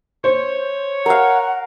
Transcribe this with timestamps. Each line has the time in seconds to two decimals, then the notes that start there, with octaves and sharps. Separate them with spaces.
0.24 C5 C#5
1.06 A#4 F5 F#5